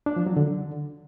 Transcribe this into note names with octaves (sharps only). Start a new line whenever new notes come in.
D4
F3
F#3
D3